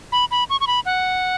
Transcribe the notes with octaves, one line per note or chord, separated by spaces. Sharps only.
B5
B5
C#6
C#6
B5
F#5